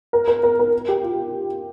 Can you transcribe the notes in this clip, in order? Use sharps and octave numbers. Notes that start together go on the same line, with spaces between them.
A#4
A#4
A#4
A#4
G4
F4